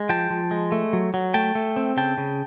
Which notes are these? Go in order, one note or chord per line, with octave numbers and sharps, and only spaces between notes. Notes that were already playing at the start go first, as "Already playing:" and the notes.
Already playing: G#3
F3 G5 A5
F3
G#3
A3
F#3
F#3
A3 G5 A5
A3
C4
C#3 G5 A5
C#3